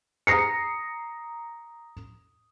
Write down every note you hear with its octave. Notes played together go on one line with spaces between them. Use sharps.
A#5 D#6 A#6 C7 C#7